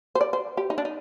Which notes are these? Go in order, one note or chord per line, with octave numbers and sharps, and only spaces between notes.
C5
D5
C5
G4
D#4
D4
D#4